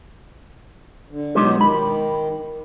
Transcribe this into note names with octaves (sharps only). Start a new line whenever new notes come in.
D3
B2 F#3 G#3 D#4 F4 G4
D#3 B5